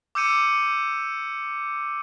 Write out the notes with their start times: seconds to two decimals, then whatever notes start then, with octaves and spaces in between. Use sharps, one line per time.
0.15 D6 E6 G6 C#7 D#7